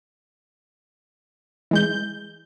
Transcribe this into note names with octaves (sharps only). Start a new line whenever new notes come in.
E3 G#3 G6